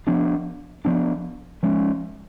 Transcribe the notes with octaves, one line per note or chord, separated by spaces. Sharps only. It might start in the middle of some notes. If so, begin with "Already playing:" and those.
F3 B3 D4
F3 B3 D4
F3 G#3 C#4